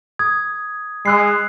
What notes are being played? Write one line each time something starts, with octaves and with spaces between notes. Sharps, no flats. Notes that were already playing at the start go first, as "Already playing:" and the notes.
D#6 G#6
G#3 E6 F#6 C7